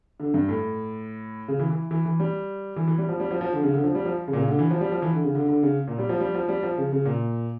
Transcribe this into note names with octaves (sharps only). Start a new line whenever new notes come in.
D3
G2
A2
C#3
E3
E3
E3
E3
G3
E3
E3
G3
F3
G3
F3
F3
D3
C#3
D3
F3
G3
F3
C#3
A#2
C#3
D3
E3
F3
G3
F3
E3
D3
C#3
D3
D3
C#3
A#2
G3
F3
G3
F3
G3
F3
C#3
C#3
A#2